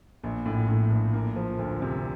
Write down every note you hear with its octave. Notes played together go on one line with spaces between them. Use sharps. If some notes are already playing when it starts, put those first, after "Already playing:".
A#1
A2
A2
A#1
A#3
F3
D2
C3